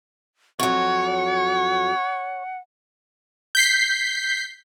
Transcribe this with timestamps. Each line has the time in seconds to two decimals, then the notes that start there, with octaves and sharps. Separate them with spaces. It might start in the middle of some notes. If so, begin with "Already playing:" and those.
0.60 F2 F#3 C#5 F#5
3.55 G6 B6 C7